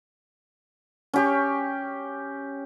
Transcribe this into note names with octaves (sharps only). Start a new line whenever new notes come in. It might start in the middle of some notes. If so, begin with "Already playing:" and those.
C#4 G4 C#6